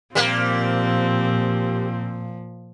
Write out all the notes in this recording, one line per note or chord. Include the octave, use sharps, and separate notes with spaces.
A#2 F3 G3 A#3 C4